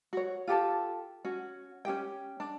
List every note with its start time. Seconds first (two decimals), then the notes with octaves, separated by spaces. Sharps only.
0.13 F#4 C#5
0.47 F4 G4 A4 A5
1.25 C#4 F#4
1.85 C#4 F#4 G4 G5
2.40 D4